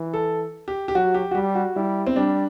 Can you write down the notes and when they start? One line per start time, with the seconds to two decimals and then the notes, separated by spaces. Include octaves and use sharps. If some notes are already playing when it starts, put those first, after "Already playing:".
Already playing: E3
0.14 A4
0.68 G4
0.88 G4
0.95 F#3 F#4
1.14 G4
1.31 F#4
1.35 G3 G4
1.55 F#4
1.76 G3 E4
2.07 C4
2.16 G3 D4